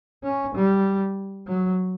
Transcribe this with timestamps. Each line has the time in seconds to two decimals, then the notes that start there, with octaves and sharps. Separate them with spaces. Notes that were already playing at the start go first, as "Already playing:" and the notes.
0.23 C#4
0.55 G3
1.47 F#3